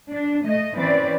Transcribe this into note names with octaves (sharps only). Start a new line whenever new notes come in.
D4
A3 D#5
E3 C4 C#4 B4 D5